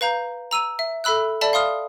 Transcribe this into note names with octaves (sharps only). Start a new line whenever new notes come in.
B4 F5 A#5 G6
A#5 E6 D#7 F7
E5
A4 E5 B5 E6 F#6
A4 D5 E5 A5 B5
F5 C6 D#6 F6